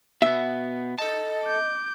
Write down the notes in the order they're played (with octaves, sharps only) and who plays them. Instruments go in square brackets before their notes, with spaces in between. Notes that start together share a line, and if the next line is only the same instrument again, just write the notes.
[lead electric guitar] B2 B3 [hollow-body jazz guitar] E5
[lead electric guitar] A4 A5 [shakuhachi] D#5
[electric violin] D6 G6